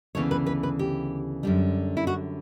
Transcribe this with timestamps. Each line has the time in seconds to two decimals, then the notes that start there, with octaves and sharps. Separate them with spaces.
0.15 D2 C#3 E3 B3 C#5
0.31 B4
0.46 B4
0.63 B4
0.79 G4
1.43 F#2 D3 G3
1.97 E4
2.07 F#4